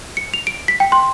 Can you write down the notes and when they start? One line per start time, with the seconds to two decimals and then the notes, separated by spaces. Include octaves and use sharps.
0.17 C#7
0.34 F7
0.47 D7
0.68 B6
0.80 G5
0.92 C6